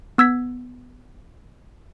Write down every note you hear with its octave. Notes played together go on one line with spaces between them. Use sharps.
B3 E6 G#6 B6